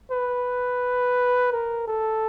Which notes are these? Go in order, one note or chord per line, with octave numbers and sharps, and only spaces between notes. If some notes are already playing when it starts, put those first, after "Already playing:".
B4
A#4
A4